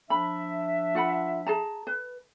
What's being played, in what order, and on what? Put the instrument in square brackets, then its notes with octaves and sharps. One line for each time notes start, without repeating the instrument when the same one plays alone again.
[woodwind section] F3 D4 E5 [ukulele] B5
[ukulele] F4 F#5 B5
G#4 A5 A#5
B4